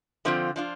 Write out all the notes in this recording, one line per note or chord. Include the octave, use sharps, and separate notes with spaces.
D3 F3 C4 F4
F3 D4 F4